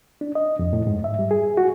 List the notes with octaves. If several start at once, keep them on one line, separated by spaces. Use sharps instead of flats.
D4
D#5
F2
A2
G#2
E5
G3
G#4
F#4